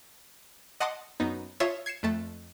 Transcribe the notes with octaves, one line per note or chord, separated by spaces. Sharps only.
D#5 F#5 A5 C6 D6 D#6
F#2 B3 D#4
F4 C#5 E5 A5 C6 D#6
G#6 C7 C#7 E7
F2 A3 A5